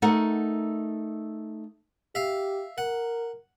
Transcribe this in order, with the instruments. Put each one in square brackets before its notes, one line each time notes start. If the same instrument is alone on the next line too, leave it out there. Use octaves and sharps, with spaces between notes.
[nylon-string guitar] A3 D#4 A#4 F#5
[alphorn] G4 [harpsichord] E5 F5
[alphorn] A#4 [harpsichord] F#5